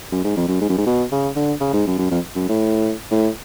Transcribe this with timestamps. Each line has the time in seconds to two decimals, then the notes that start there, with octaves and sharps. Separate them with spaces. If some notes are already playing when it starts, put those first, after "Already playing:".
0.12 F#2
0.24 G#2
0.37 F2
0.48 F#2
0.61 G#2
0.69 F#2
0.77 G#2
0.86 B2
1.12 C#3
1.36 D3
1.60 C#3
1.73 G#2
1.87 F#2
1.98 F#2
2.11 F2
2.35 F#2
2.49 A2
3.11 A2